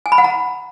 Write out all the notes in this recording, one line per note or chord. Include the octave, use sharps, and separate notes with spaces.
G#5
B5
F#5
A#5